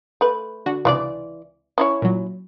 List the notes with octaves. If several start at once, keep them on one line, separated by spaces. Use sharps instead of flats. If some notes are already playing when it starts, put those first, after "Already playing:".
A3 B4
D3 F#4
C#2 C3 E3 D4 F4 D5
C#4 E4 C#5
A#2 F#3